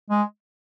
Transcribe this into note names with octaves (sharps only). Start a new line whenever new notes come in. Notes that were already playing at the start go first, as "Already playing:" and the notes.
G#3